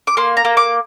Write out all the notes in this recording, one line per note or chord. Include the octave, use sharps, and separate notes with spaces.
D6
A#3 C6
A#5
A#3
D6